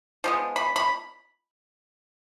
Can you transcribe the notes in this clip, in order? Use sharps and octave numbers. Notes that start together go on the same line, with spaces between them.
F3 G#3 B3
B5
B5